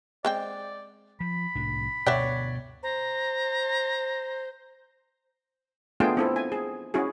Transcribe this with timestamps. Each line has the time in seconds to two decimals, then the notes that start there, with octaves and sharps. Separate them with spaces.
0.25 G#3 C4 D5 G5
1.20 F3 B5
1.55 C2 A2 D4
2.06 D2 G2 B2 C#5 D5 E5 F#5 G5
2.83 C5 A#5
6.00 A3 B3 D4 F4 G#4 G5
6.17 C4 E4 A4
6.36 G#5
6.52 G#4
6.94 C#4 E4 F#4 G#4